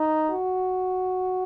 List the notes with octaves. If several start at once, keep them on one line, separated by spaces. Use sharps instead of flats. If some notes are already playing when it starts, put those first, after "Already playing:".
Already playing: D#4
F#4